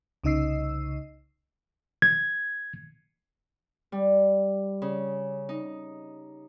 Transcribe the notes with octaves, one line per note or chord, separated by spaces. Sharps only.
C2 C#3 D#4 D#5 E6 C7
G#6
G3
C#3
D#4